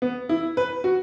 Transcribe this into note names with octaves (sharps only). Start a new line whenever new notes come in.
B3
E4
B4
F#4